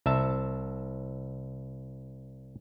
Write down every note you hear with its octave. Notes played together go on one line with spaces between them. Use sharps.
C2 E5 A5